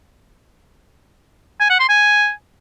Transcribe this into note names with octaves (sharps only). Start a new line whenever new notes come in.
G#5
F#5
C6
G#5